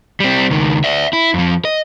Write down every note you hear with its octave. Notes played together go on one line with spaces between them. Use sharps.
G3 C4
C#2 D#3
D5 E5
E4
F2 F3
D#5